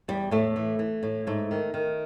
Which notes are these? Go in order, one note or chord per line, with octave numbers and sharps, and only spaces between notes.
E2 G3
A2 A3
E3
E3
A2
G#2 A3
D#3
D#3